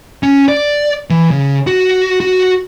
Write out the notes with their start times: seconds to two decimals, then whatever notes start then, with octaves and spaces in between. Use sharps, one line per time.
0.23 C#4
0.48 D5
1.10 E3
1.31 C#3
1.67 F#4
2.20 F#4